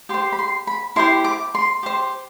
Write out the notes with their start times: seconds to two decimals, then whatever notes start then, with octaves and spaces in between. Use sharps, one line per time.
0.09 G4 C6
0.14 C5
0.32 B5
0.39 C6
0.67 B5
0.96 E4 G4 C5 C6
1.24 D6
1.55 C6
1.83 G4 C5